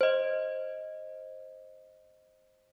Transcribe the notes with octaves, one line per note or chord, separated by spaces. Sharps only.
C5 D#5